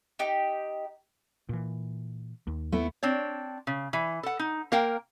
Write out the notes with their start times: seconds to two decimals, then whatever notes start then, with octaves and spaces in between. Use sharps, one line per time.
0.19 D#4 G4
1.49 A#2 E3
2.47 D#2
2.72 A3 B3 E4
3.03 C4 D4 C#5
3.67 C#3
3.93 E3
4.23 A4 F#5
4.39 D#4
4.72 A#3 A#4 F5 G5